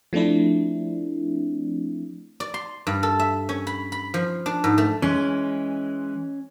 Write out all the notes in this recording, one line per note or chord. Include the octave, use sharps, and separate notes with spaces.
F3 A3 C4 D4 E4
D5
C6
G2
A4
E5
C#4
B5
B5
F3
D4
G#2
A3
E3 G#3 C#4